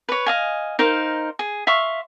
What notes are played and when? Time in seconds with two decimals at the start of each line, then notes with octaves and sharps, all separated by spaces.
0.09 B4 C#5
0.26 D#5 F5 G#5
0.79 D#4 A#4 C5 F5
1.39 G#4
1.67 E5 F5 C6 C#6